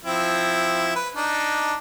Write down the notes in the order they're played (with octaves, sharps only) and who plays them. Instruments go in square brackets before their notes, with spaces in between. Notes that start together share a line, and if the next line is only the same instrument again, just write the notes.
[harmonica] F3 C4 E4
B4
D4 D#4